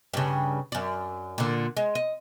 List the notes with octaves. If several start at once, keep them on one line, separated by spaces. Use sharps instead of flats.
G2 C#3
F#2 D5
A#2 D3
G#3
D#5